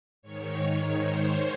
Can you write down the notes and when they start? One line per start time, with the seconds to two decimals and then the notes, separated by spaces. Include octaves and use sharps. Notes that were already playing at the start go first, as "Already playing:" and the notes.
0.22 G#2 D#3 C#5
1.00 C5